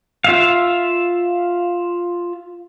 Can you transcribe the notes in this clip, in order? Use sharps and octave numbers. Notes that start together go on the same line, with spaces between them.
F4 E5 F5